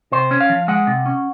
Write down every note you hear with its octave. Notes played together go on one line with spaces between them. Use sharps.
C3 C5
C#4
F5
F3
G#3 F#5
C3
C#4